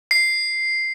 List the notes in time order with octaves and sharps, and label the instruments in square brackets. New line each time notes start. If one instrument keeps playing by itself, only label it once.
[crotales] C7